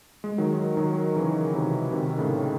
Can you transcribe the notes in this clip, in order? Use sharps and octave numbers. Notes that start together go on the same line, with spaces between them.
G#3
D#3 F#3
D#3 F#3
C#3 E3
C3 D#3
C3 D#3
A2 C#3